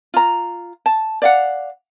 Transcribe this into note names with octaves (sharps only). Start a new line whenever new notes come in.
F4 A#5
A5
D5 F5 F#5